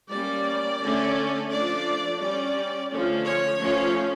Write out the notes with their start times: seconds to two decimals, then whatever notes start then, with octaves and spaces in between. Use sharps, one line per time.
0.11 G3 A#3 C#4 D5
0.81 D3 A3 C#4
1.50 F3 A3 D4 D5
2.20 G3 C#4 D5
2.90 D3 F3 A3 C#4
3.24 C#5
3.60 F3 A3 C#4